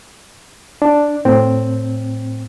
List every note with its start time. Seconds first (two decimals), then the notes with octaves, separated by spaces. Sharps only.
0.82 D4
1.25 A2 C4